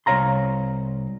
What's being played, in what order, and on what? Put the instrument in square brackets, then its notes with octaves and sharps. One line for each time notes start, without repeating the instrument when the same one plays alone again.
[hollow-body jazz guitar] C2 D#3 C#5 F5 A#5 C6